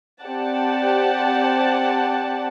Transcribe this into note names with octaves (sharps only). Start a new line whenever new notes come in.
C4 G4 D5 F#5 A5